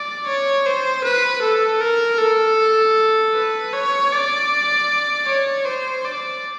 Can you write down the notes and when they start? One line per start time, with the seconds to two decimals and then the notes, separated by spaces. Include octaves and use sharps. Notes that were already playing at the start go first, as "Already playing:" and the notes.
Already playing: D5
0.27 C#5
0.66 C5
1.04 B4
1.42 A4
1.81 A#4
2.19 A4
3.34 B4
3.73 C#5
4.12 D5
5.27 C#5
5.65 C5
6.05 D5